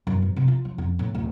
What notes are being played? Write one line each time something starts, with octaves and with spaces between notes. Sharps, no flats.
F#2
A1
C3
F4
F3
F2
A2
D1